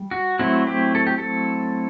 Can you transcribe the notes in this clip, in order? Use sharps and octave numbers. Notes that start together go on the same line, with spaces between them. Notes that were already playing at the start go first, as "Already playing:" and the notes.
Already playing: G3
F#4
F#3 A3 C4 E4 F#4
G4
A4
G4
A4